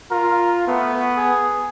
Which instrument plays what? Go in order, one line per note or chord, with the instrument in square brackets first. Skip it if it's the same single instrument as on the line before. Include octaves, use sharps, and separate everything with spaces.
[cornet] F4 [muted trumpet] A#4
[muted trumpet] A3 [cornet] B3
[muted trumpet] G#4